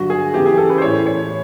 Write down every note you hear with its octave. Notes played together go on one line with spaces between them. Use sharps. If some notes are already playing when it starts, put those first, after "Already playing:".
Already playing: G2 D3 F#3 F#4
G#4
E2 C#3 E3 G4
G#4
A4
B4
C5
A2 E3 C#5
C#5